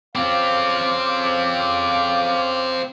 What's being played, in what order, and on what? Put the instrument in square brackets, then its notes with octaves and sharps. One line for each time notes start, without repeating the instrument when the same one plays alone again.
[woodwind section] C#3 F5 D6 [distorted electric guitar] C4 F4